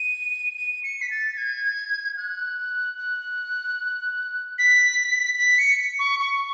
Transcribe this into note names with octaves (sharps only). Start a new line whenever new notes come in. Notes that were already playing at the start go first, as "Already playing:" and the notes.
Already playing: D#7
D#7
C#7
B6
A6
G#6
F#6
F#6
B6
B6
C#7
C#6
C#6